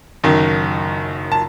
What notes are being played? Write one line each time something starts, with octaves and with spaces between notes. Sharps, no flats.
F#1 F#2 D#3
A5